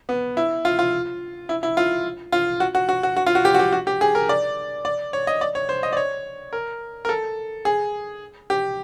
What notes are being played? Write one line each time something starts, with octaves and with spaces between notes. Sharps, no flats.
B3
E4
F4
F4
E4
E4
F4
F4
F#4
F#4
F#4
F#4
F#4
F4
F#4
G4
F#4
G4
F#4
G4
G#4
A#4
D5
D5
C#5
D#5
D5
C#5
C5
D#5
D5
C#5
A#4
A#4
A4
G#4
G4